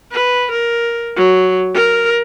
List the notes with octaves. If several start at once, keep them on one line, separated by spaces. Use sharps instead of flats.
B4
A#4
F#3
A#4